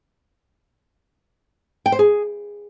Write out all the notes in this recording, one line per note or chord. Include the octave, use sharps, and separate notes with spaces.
G5
C5
G#4